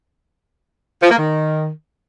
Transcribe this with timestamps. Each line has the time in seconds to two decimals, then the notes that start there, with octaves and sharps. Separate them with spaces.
1.03 F3
1.11 A#3
1.19 D#3